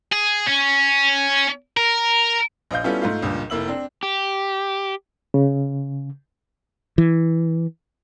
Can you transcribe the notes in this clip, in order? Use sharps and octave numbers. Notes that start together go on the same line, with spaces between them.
G#4
C#4
A#4
A#1 D#5 F5 G6
G3 B3 C#4 E4 F4 A4
G#2 A3 F4
C#2 G2 A#2
F1 A#3 E4 E6 F#7
C4 D4
G4
C#3
E3